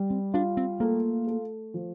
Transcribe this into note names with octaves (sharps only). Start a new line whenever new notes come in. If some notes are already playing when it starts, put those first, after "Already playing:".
Already playing: G3
C4
D4 F4
C4
A3 A#3
A3
F3